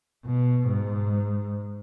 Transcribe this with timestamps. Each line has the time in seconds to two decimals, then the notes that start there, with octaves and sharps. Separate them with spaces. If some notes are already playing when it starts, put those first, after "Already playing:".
0.25 B2
0.68 G#2